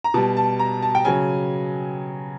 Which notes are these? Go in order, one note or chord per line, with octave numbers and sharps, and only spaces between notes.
A#5
B2 G3 A5
A5
A#5
A5
G5
C#3 F#3 G#5